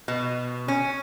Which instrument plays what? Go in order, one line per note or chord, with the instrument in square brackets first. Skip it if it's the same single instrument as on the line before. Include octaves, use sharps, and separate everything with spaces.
[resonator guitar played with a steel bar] B2
C#4